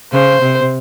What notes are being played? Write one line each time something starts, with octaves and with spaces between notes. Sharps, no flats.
C#3 C5
C3